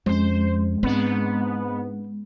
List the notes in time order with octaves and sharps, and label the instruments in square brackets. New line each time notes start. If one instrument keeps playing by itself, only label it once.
[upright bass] F2 C#4 [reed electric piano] G#3 [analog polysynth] C5
[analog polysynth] G#2 B3 [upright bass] C4 D4